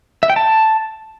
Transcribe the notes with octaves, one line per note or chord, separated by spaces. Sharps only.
E5
G5
A5